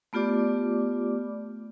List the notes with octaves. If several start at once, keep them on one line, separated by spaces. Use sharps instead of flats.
A3 B3 F4 G4 D5 D6